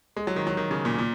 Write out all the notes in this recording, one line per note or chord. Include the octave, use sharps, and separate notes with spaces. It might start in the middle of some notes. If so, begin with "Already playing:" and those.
G#3
F#3
D#3
F#3
D#3
C#3
A#2
A#2